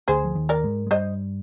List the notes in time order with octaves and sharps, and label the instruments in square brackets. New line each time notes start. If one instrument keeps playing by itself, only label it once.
[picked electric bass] D2 D3 [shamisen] G#4 C5
[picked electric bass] F3
D#2 D#3
[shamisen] A#4 D5
[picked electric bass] G#2 G#3
G#3
[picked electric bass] G2 G3 [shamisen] C5 D#5